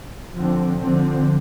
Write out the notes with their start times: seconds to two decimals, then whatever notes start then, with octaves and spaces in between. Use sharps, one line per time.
0.33 D3 F3 C4
0.81 D3 F3 C4